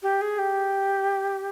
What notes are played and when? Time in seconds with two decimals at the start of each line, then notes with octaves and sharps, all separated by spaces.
0.03 G4
0.21 G#4
0.39 G4